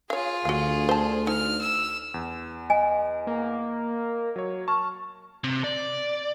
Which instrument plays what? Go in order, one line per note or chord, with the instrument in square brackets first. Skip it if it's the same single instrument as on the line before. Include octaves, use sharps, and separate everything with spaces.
[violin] F4 G#4 [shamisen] C#5 F5
[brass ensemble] D2 [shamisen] F#4 F5
[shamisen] C5 A5
[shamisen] D#4 [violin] F6
[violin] E6
[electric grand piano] E2
[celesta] D#5 [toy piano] G#5
[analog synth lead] A#3
[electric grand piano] F#3 C#5
[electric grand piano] A5 F6 [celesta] C#6
[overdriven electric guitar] C3
D5